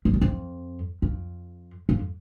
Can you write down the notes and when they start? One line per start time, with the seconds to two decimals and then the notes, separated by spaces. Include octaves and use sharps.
0.05 F2
0.13 F#2
0.21 F2
1.02 F2
1.89 F2